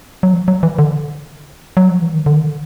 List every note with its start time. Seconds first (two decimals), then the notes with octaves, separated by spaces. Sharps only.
0.23 F#3
0.33 F3
0.48 F#3
0.63 E3
0.79 D3
1.77 F#3
1.89 F3
2.02 E3
2.14 D#3
2.26 D3
2.34 D#3